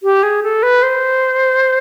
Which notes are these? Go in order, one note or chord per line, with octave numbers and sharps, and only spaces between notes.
G4
G#4
A4
B4
C5